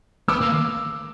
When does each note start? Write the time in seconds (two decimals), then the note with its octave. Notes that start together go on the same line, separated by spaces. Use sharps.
0.28 B3 D6 E6
0.41 A#3